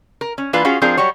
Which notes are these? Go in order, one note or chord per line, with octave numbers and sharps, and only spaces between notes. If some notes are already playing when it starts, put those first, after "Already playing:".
A#4
C#4
E3 A#3 D4 F4 B4
C#4 F4 F#4 G#4
F3 C4 D4 F4 G#4 A#4
F#3 G3 F#4 C#5